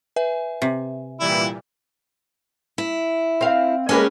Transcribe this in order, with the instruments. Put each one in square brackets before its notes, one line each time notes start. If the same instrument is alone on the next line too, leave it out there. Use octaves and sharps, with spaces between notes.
[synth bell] B4 E5 G#5
[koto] C3
[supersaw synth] A#2 E3 G3 [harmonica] E4
[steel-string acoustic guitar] E4
[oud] C4 F5
[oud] G#3 A#3 B4 [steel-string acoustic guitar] C#4 G4 G#4